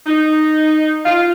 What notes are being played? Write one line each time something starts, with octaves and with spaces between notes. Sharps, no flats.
D#4
F4